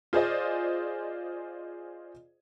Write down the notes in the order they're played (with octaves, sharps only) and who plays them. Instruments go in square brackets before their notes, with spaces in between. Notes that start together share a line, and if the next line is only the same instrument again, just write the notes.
[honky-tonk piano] F4 G#4 C5 D5 D#5